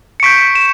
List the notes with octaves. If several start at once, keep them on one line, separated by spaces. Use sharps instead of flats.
C#7
C#6 G6 B6 D7
E7